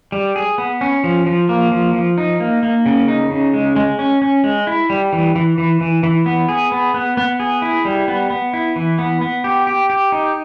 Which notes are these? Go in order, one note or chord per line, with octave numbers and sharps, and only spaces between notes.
G3
G#4
B3
C#4
F3
F3
A#3
F3
F3
D#4
A#3
A#3
C#3
D#4
C#3
G#3
G#3
C#4
C#4
G#3
E4
G3
E3
E3
E3
E3
E3
B3
G#4
B3
B3
B3
G#4
E4
G3
B3
B3
E4
E3
B3
B3
G4
G4
G4
D#4